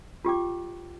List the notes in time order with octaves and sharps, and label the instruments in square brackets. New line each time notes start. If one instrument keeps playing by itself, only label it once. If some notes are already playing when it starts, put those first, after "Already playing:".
[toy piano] F4 G4 G5 D6